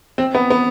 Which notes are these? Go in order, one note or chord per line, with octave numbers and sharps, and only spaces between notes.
C4
B3
B3